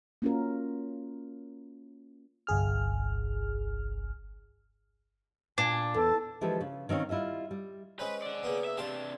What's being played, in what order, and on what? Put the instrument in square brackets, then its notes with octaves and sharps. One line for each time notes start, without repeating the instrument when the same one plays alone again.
[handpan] A#3 C#4 F4 F#4 A#4
[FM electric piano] G1 C2 G#4 F6
[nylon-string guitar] A#2 [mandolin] D4 [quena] G#5
[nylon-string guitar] E2 [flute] A4 [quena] A5
[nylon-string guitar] E3 F3 G#3 D4 G4 A4
C#3
D#3 C4 C#4 F5
G3 E4 F4 D#5 E5
G3
[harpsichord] G#3 C4 C#4 [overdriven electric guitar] B4
[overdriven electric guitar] D5 F#5
[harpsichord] C#3 A#3 B3
[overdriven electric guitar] E5
[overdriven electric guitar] C3 D4 [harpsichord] G4 F5 C6